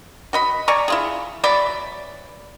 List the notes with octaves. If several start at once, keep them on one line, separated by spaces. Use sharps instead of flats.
F#4 D#5 B5
D5 G#5 A#5 C#6
E4 F4 G#4
E3 F#3 D5 B5